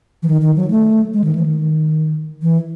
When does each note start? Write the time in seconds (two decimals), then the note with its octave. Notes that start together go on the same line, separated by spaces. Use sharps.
0.23 E3
0.28 D#3
0.41 D#3
0.56 F#3
0.71 A3
1.14 G#3
1.24 D#3
1.35 E3
1.46 D#3
2.42 E3